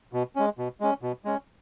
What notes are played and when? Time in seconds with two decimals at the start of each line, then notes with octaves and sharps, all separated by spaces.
0.13 B2
0.36 G#3 C#4
0.58 B2
0.80 G#3 C#4
1.02 B2
1.25 G#3 C#4